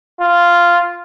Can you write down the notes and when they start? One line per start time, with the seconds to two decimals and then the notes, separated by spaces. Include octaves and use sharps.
0.20 F4